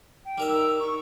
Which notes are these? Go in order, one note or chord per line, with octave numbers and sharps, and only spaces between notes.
G5
G3 D#4 A#4 E5
E6
C#6